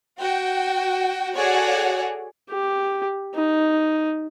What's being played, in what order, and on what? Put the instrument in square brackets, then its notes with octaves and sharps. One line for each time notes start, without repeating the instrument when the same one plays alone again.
[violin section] F#4 G5
F#4 G#4 A4 C#5 D5 F#5
[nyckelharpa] G4
D#4